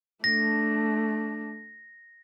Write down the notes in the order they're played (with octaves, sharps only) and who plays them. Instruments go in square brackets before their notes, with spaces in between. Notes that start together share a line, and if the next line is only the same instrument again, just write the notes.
[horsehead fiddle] A3 D4 [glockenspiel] A#6